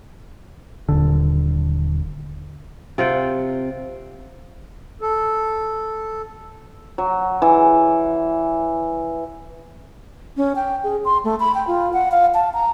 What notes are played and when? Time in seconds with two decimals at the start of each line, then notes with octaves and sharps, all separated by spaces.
0.89 D#1 D3
2.98 C3 F4 F#5 G5
5.01 A4
6.98 F#3
7.42 E3
10.37 C#4
10.56 G5
10.84 G#4
11.05 C6
11.24 A3
11.40 B5
11.55 G5
11.67 F4
11.93 F#5
12.12 F5
12.34 A5
12.54 A#5